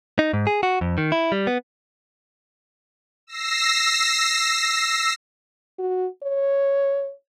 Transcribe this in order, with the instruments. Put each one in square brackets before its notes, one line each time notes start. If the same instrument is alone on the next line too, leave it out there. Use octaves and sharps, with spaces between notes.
[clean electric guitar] D#4
G#2
G#4
F#4
F2
D#3
E4
G3
B3
[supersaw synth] E6 A#6 C7
[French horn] F#4
C#5